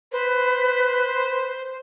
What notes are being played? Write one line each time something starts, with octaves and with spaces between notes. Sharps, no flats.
B4 C5